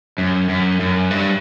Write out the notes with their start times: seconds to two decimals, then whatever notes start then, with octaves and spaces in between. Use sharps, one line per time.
0.18 F#2
0.49 F#2
0.80 F#2
1.11 G2